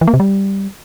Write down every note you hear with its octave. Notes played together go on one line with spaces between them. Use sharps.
E3
A#3
C3
G3